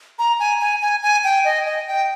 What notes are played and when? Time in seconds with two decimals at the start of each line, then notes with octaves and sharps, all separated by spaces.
0.19 A#5
0.39 G#5
0.61 G#5
0.81 G#5
1.03 G#5
1.24 G5
1.45 D#5
1.66 D#5
1.88 G5